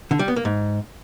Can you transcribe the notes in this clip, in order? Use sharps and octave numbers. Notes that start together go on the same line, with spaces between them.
D3
G3
B3
A#3
G#2